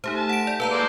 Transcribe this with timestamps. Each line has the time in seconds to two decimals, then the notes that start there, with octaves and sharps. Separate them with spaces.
0.04 A3 D#4 G4 C5
0.16 A5
0.29 F#5 D7
0.47 D5
0.60 A#3 B4 F5 A5 A#5
0.72 G#3 C5 D5